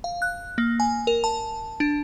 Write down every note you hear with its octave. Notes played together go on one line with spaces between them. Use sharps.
F5
F#6
A#3
G#5
A#4
A5
D4